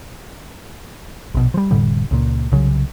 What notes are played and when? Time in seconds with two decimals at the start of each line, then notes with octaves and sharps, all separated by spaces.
1.35 A#1 B2
1.54 F3 G3
1.71 F1 A2 D3 G3
2.11 C#2 A#2
2.52 C2 C#3 F#3